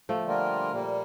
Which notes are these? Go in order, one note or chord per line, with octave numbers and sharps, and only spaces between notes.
F3 A3
D3 G3 A#3 F4 A#4
A#2 G3 A#3